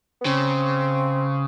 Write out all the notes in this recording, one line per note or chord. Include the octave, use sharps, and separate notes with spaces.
B3
C#3 C4